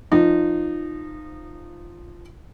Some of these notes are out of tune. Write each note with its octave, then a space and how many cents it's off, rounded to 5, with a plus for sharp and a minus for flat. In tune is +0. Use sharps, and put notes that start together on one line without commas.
F3 -5 D#4 -20